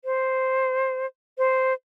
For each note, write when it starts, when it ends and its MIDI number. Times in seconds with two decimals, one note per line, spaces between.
0.05 1.06 72
1.38 1.73 72